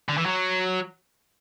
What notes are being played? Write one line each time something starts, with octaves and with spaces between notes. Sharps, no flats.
D3
E3
F#3